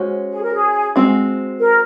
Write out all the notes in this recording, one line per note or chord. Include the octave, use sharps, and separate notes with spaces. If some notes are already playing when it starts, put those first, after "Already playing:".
Already playing: G#3 C#4 F#4 C5
G#4
A#4
G#4
G#3 C4 F#4
A#4